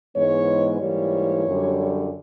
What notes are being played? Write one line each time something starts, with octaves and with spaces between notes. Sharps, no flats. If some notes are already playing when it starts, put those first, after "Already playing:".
G#2 E3 G#3 B3 C#5
G#2 E3 G3 A#3 C#5
F#2 D3 G3